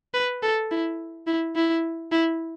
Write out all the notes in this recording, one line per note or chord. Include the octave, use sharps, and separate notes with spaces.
B4
A4
E4
E4
E4
E4